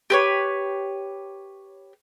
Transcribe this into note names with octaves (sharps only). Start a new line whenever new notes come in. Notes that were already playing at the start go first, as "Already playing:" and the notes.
G4 B4 C#5